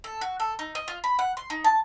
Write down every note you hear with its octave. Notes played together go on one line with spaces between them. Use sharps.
A4
F#4
A4
D#4
D#5
F4
B5
F#5
C6
D#4
A5